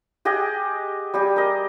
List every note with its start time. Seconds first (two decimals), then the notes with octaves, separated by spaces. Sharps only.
0.25 G4 G#4 D#5 F#5
1.14 G3 G4 G#4
1.36 A#4 D#5